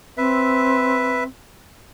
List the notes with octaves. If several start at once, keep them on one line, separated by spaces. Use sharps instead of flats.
C4 B4 E5